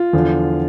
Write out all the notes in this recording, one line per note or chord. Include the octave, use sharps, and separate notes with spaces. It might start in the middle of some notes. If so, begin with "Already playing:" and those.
Already playing: F4
E2 D3 F3